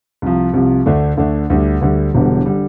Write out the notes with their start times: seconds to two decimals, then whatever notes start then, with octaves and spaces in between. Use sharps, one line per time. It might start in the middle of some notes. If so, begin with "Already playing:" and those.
0.22 C2 C3 F3
0.54 C2 C3 F3
0.86 D2 D3 A3 D4
1.17 D2 D3 A3 D4
1.50 D2 D3 G3
1.81 D2 D3 G3
2.15 E1 E2 D3 G3
2.46 D3 G3